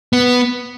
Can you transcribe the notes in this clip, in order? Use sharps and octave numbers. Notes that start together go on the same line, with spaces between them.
B3